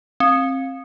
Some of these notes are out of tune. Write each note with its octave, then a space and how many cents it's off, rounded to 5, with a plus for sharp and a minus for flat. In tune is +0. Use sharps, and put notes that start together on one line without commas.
C4 +30